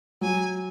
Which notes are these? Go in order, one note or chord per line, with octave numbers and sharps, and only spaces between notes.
F#3 G#5